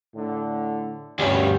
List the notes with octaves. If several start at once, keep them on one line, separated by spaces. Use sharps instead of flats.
A2 D3
D2 G2 C3 G3 C#4